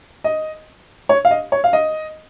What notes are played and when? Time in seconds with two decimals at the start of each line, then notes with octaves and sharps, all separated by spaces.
0.24 D#5
1.09 C#5
1.25 F5
1.31 D#5
1.52 C#5
1.64 F5
1.73 D#5